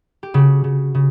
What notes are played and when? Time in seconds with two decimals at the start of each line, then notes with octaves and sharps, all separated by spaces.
0.23 G4
0.34 C#3 F#4
0.64 C#3
0.95 C#3